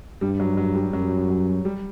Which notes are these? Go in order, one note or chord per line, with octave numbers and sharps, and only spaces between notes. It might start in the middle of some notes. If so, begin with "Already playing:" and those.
G2 G3
F#3
F#3
G3
F#2 F#3
F#3
G3